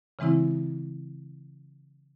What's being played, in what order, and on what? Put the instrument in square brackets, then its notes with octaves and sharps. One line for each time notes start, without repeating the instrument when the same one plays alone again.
[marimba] C#3 E3 G#3 C4 E4